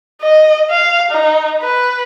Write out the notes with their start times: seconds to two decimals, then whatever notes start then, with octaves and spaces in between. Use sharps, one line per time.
0.21 D#5
0.70 F5
1.11 D#4
1.62 B4